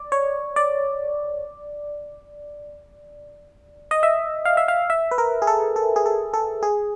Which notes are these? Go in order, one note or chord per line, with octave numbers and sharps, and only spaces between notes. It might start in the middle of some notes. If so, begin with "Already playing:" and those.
Already playing: D5
C#5
D5
D#5
E5
F5
E5
F5
E5
B4
A#4
G#4
A4
A4
G#4
A4
A4
G#4